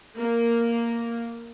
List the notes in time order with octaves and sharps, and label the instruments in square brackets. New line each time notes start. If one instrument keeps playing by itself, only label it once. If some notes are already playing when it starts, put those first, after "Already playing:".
[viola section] A#3